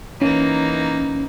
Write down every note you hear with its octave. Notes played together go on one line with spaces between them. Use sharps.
E3 A#3 C#4 D#4